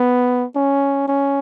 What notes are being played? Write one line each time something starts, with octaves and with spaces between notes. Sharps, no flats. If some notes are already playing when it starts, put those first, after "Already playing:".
Already playing: B3
C#4
C#4